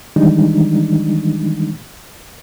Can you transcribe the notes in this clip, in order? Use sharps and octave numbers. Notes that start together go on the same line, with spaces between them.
D#3 E3 G3 G#3 D4 D#4